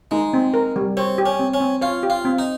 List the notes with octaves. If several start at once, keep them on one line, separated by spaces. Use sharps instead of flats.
G#3 D#4
C4
A#4
G3
C4 C#5
G4
C#4
C4
C#4
C4
F4 C#5
G4
F4
C4
D#4